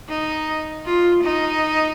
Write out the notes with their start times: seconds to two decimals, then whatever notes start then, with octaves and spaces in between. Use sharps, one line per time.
0.09 D#4
0.85 F4
1.24 D#4